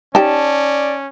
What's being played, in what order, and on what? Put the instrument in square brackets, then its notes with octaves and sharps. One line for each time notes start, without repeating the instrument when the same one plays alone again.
[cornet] C#4 [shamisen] D#4 G4 [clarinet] D5 [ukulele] A5